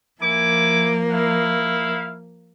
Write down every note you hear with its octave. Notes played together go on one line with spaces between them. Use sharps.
F3 A#3 E4 G#5 D6
E4 F5